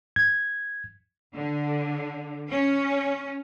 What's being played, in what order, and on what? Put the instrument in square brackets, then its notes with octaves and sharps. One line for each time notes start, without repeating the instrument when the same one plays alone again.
[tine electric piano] G#6
[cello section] D3
C#4